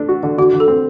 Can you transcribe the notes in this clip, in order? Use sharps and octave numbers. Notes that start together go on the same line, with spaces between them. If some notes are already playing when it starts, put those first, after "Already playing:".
Already playing: A3 D4
F#4
D3
D3 F#4
D3
A4
C4